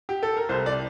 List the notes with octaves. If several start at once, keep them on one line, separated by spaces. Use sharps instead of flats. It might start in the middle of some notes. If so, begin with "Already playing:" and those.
G4
A4
A#4
C2 C5
D5